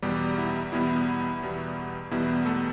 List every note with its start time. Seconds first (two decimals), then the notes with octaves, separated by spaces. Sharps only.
0.02 E2 B2 G3 B3 G4
0.38 E4
0.72 E2 B2 G3 B3 E4
1.42 E2 B2 G3 B3
2.11 E2 B2 G3 B3 E4
2.46 A3 A4